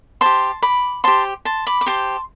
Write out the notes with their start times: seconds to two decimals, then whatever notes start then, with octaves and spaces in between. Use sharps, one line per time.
0.21 G4 C5 A5 C6
0.62 B5 D6
1.04 G4 C5 A5 C6
1.45 A5 C6
1.67 B5 D6
1.81 D6
1.86 G4 C5 A5 C6